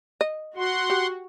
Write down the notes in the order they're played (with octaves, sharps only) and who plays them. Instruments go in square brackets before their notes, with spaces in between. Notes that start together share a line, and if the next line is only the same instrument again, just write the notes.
[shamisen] D#5
[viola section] F#4 [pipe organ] F#5 C6
[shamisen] G4